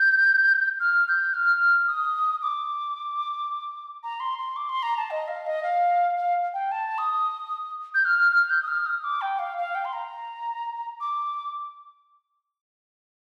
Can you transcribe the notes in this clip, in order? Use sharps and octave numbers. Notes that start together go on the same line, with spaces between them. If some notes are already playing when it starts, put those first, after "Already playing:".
Already playing: G6
F6
G6
F6
D#6
D6
A#5
C6
C6
D6
C6
A#5
A5
D#5
F5
D#5
F5
F5
G5
A5
D#6
G6
F6
F6
G6
D#6
F6
D#6
D6
G5
F5
F5
G5
C6
A#5
D6